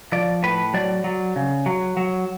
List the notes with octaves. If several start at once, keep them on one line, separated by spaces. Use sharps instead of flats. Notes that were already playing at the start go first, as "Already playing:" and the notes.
F3 D5
A2 B4
F#3 D5
F#3
C#3
F#3
F#3